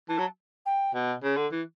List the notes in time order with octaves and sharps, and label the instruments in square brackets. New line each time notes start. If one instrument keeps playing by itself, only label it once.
[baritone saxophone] E3 [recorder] A5
[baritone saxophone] F#3
[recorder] G5
[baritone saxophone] B2
C#3
D3
E3